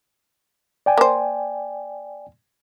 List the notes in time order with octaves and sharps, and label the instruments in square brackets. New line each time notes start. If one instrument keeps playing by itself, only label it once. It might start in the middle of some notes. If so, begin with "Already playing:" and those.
[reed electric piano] D5 G5 G#5
[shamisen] A#3 C5